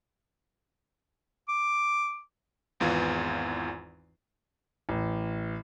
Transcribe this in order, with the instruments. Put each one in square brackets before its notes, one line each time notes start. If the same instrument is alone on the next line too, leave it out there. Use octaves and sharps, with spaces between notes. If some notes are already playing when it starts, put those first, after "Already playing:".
[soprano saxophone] D6
[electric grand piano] G#1 E2 E3 F4
[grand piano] A1